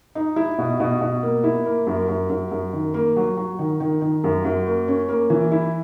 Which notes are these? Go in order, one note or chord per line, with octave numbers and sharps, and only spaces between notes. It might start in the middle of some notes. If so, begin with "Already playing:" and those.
D#4
E4
B2
B2
B2
A#3
E4
A#3
F#2
F#2
F#2
F#2
D#3
A#3
F#3
F#3
D#3
D#3
D#3
F#2
F#2
A#3
C#4
A#3
E3
E4